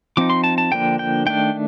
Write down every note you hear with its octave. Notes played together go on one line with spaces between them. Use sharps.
F3 C4 D#4 D6
C6
A5
A5
D3 F3 A#3 D4 G5
G5
D#3 A3 D4 G5